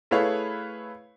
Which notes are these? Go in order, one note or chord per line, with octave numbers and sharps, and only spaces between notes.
A3 E4 G#4 B4 C#5 F5